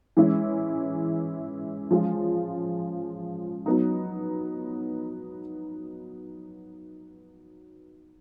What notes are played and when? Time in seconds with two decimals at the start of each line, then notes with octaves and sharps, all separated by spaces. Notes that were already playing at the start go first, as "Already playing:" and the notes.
0.17 E3 G#3 C#4 E4
1.91 F3 G#3 C#4 F4 G#4
3.66 F#3 B3 D#4